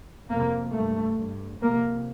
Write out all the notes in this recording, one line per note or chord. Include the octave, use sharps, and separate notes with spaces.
F2 C3 A#3
G2 A3
G2
F2 C3 A#3